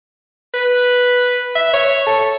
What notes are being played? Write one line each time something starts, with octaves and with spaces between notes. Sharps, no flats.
B4
E5
C#5
A4